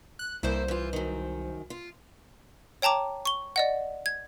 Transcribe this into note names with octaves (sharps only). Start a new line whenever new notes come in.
F#6
C2 G2 A#3 E4 C5
E3 F4
F#2 D#3
F4
C#5 G5 A5 A#5 D6
C#6 G7
D5 D#5 F#5
G#6